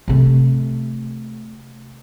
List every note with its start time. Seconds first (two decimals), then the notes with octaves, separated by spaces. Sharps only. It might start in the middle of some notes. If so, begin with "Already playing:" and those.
0.08 C3 A3